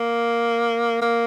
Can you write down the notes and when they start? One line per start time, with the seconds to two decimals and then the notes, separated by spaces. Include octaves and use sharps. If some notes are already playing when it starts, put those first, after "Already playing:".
Already playing: A#3
1.01 A#3